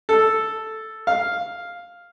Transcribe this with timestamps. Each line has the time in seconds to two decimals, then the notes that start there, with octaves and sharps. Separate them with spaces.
0.09 A4
1.07 F5